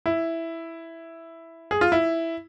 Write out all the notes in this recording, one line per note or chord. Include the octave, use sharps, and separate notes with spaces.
E4
G#4
F4
E4